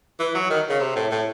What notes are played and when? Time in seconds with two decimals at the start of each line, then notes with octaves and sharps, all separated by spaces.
0.19 E3
0.35 F#3
0.50 D#3
0.69 C#3
0.80 C3
0.96 A2
1.11 A2